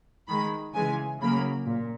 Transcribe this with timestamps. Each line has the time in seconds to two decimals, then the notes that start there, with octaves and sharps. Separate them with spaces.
0.28 D#3 G#3 B5
0.74 C#3 E3 G#3 G#5
1.20 C#3 F#3 A#3 B5
1.67 A#2